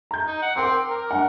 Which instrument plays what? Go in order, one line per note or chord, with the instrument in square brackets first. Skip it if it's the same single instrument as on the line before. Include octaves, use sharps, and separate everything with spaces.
[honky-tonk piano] A#5 G6
[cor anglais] D#4
F#5
[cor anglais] C4 [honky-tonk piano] A#4 G5 D6
[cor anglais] A#4
[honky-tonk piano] G2 F#5